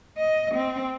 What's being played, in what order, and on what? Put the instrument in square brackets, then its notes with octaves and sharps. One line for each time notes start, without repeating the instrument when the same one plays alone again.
[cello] D#5
C4